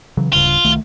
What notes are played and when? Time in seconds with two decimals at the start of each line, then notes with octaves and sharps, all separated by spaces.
0.17 C#3 E3 F#3
0.33 D1 G2 C#3 F4
0.65 C2 D#3 A3